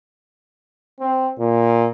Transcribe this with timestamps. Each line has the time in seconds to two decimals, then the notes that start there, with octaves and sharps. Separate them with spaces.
1.00 C4
1.39 A#2